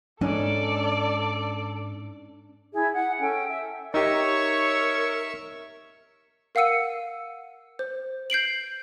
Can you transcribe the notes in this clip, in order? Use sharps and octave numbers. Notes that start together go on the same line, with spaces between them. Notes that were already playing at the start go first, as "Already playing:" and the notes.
G#2 C#4 D4 A4 D5
E4 G#4 E5
F#5
C#4 A4 G5 G#5
E5
D#4 G4 A#4 C#5 E5 C#6 E6
A#4 F5 F#5 E6 C#7 D#7
C5
G6 C7 D7 F#7